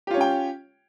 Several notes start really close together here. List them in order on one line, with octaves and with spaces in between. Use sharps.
G4 F4 C#5 C#4 G5